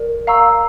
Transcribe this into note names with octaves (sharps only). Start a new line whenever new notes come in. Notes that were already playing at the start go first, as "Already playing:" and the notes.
Already playing: A#4 D5
F5 A#5 C#6 E6